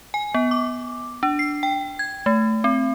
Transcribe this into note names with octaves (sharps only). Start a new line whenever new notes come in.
G#5
B3
D6
D4
C7
G5
G#6
A3
C4